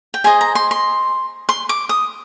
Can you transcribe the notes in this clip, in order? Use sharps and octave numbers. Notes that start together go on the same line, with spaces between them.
G5
G#4 C5 D#5 G#5
A#5
C6
C6
C6
D6
D#6